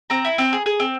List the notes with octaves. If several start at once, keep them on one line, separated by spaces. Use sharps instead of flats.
C4 A#5
E4
C4
G#4
G#4
C4